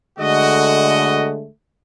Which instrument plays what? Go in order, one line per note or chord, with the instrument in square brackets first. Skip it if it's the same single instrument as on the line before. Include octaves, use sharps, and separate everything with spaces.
[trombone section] D3 G#3 A3 [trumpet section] F#4 D#5